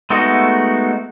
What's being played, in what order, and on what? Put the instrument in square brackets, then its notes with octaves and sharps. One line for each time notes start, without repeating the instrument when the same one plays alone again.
[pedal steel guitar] G#3 A3 B3 D#4 F#4